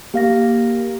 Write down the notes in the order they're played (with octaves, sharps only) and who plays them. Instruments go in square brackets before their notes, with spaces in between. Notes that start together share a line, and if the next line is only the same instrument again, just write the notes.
[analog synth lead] A#3 [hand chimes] G4 F5 A#6